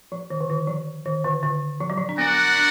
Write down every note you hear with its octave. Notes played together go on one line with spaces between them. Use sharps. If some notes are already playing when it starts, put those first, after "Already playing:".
F3
D#3
D3
D#3
F3
D#3
D3
D3
F3
F#3
F3
D4
B3 F#4 A#4 D5 F#5
D4